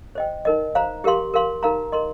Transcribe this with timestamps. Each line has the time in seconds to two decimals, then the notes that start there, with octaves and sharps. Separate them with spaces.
0.15 C5 D#5 G5
0.45 D#4 A#4 D#5
0.75 C5 F5 A#5
1.04 G4 A#4 F5 C6
1.34 A#4 F5 C6
1.63 D#4 A#4 F5 A#5
1.92 A#4 D#5 C6